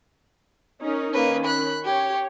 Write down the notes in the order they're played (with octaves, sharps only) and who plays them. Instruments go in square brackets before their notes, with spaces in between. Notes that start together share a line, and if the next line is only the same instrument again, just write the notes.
[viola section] C#4 D#4 A#4
[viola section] D#3 C#4 [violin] A#3 B4
[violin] B5 F#6
[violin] G4 [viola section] C#5